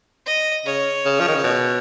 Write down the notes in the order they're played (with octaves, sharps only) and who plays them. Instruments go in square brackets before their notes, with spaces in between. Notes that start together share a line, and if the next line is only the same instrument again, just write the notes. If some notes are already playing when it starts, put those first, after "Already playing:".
[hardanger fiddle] D#5
[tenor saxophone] C#3 [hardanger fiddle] C#5
[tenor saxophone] C#3
F3
D#3
C#3
B2